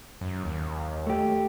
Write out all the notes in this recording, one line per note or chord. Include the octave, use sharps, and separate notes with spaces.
F#2
D#2
A3 G4